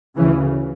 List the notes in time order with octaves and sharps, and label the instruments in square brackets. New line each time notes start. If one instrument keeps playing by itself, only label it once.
[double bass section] D2 C#3 E3